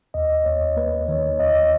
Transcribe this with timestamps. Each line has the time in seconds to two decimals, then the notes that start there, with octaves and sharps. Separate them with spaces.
0.14 D#2 D#5
0.45 D#2 C#5
0.77 A#3 B4
1.08 D#3 C#5
1.39 D#2 D#5